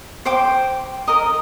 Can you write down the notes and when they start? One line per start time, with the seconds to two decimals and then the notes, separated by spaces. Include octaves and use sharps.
0.25 C5 G5 D6
1.08 A#4 D#5 A#5 D#6